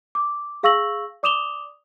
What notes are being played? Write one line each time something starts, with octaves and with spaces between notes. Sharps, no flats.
D6
G#4 F5 C#6 E6 A#6 F#7
D5 D6 D#6 E7 F7 G7